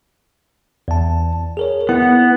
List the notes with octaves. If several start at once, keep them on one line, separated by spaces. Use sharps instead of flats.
E2 A5
G#4 A#4 C#5
B3 E4